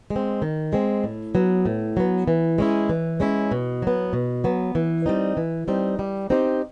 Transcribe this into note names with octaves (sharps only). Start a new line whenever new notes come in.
G#3
C4
D#3
G#3 C4
A2
F#3 B3
A2
F#3 B3
E3
G#3 C#4 E4
E3
G#3 C#4 E4
B2
F#3 B3
B2
F#3 B3
E3
G3 C4 D#4
E3
G3 C4 D#4
G3
C4 D#4 G4 C5